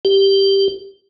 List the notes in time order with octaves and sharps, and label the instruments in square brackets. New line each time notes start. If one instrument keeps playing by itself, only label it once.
[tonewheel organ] G4